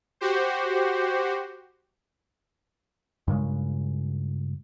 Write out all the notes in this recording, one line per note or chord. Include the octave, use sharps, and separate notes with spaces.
F#4 G4 C5
G2 A#2 C#3 G#3